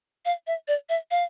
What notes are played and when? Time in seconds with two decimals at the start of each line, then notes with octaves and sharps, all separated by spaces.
0.25 F5
0.47 E5
0.68 D5
0.89 E5
1.11 F5